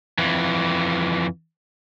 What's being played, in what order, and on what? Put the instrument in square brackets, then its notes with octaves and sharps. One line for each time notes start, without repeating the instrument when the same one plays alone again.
[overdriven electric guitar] F2 E3